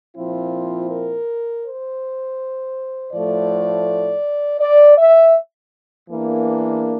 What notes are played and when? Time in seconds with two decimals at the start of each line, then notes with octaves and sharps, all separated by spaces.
0.16 A#2 F3 C4 E4 F4
0.90 A#4
1.64 C5
3.12 A2 F3 A3 D5
4.60 D5
4.98 E5
6.08 E2 E3 A#3 D4